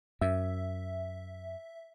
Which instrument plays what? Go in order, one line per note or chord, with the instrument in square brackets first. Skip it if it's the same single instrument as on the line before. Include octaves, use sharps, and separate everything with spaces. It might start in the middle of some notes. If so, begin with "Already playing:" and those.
[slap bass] F#2 [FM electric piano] E5